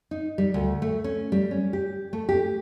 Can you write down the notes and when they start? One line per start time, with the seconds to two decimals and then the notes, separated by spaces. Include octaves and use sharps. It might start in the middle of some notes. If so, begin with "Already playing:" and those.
0.11 D#4
0.38 G3
0.54 D2
0.82 A3
1.04 C#4
1.32 G3
1.51 C#4
1.73 G4
2.13 A3
2.29 G4